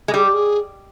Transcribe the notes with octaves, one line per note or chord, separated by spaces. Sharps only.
G#3
G3 G#4
G4
G#4